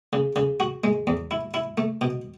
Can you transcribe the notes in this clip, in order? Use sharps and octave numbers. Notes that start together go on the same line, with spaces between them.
C#3
C#3
F#4
G#3
E2
E4
E4
A3
B2